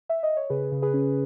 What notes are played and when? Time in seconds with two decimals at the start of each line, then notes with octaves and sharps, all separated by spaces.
0.09 E5
0.23 D#5
0.37 C#5
0.50 C#3 G#4 B4
0.72 C#3
0.82 G#4 B4
0.94 C#4